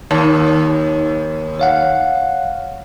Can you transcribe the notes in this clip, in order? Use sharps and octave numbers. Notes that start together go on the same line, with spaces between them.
D#2
C#5 F5 F#5